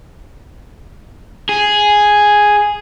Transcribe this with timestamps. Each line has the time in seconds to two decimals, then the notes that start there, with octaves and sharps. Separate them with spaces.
1.49 G#4